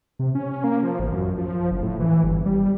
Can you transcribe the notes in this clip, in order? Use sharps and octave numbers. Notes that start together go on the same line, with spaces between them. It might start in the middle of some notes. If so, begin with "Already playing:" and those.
C3
C#4
A#3
F3
A1
F#2
F3
F#1
A2
E3
G1
G3